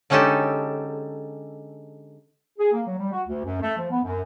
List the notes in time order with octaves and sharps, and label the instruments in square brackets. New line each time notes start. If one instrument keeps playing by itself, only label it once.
[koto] D3 G#3 C#4 D#4 G4 A4
[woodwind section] G#4
A#3
F#3
G3
F#4
D2
F#2
A3
F3
B3
F#2